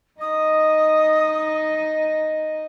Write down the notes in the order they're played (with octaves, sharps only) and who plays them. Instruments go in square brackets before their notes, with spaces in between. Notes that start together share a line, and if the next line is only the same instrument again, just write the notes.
[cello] D#4 D#5 [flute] D#6